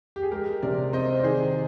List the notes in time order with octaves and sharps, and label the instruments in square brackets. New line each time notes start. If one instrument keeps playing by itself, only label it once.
[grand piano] G4
G#4
[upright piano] G#3 [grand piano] G4 A#4
[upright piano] C3 [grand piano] A#4 D5
[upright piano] C4 [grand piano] C5 D#5
[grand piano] D5
[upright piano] D#3 [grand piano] G#4 C5